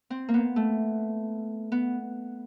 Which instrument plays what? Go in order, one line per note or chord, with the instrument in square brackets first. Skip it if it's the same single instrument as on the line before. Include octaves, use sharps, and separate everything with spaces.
[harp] C4
A#3
B3
A3
B3